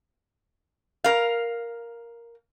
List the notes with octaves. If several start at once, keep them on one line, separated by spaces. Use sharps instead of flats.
A#4 F5